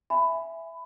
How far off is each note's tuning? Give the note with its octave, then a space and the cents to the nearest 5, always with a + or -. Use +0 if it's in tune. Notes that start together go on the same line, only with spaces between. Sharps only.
E5 +5 G#5 +0 B5 +15